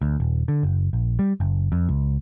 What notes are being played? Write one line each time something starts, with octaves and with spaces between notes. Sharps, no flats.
D2
D#1
D3
F#1
A#1
G3
F#1
F2
C#2